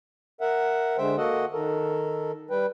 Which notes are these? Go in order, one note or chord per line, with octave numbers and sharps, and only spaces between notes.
A#4 E5 F#5
D3 G#3 C5 E5 G5
A#3 F#4 A4 D#5 F#5
D#3 A4 A#4
G3 B4 G5